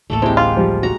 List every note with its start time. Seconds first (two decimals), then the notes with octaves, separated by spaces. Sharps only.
0.10 D1 A1 D2 A3 A#3 A4
0.22 G#3 C4 E4 G4
0.37 F4
0.56 F3 G3
0.83 F#4 A#5